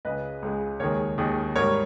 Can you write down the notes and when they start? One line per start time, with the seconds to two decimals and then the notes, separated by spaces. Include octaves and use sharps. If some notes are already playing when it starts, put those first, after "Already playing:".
0.05 C#2 C#3 G#3 B4 D#5
0.42 C#2 C#3 G#3
0.80 D#2 D#3 G#3 A#4 C#5
1.18 D#2 D#3 G#3
1.56 G#2 G3 A#4 C#5